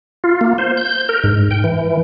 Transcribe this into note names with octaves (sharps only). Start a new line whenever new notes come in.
F4
A#3
C5
G6
A#4
G#2
G5
E3